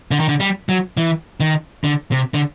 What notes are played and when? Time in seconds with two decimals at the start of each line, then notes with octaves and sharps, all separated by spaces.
0.11 D3
0.20 D#3
0.29 D3
0.40 G3
0.69 F#3
0.97 E3
1.40 D#3
1.84 D3
2.12 C3
2.34 D3